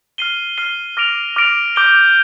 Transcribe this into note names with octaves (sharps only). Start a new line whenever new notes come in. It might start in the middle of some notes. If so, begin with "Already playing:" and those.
F6 C7 D#7 G7
F6 C7 D#7 G7
D6 F6 A#6 D7 F7
D6 F6 A#6 D7 F7
D6 G6 D7 G7